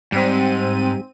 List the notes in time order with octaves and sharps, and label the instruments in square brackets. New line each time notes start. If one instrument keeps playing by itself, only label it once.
[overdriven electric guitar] G#2 [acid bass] G3 [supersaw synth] C4 D#7